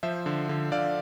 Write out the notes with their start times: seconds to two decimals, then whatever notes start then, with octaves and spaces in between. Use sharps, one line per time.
0.03 F3 C5 E5
0.26 D3
0.49 D3
0.72 D3 D5 F5